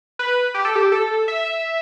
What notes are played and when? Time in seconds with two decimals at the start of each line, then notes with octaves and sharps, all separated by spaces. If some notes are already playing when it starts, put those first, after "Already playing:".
0.19 B4
0.54 G4
0.65 A4
0.75 G4
0.92 A4
1.28 E5